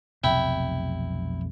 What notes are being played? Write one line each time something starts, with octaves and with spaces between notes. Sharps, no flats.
F1 B1 C3 E4 G5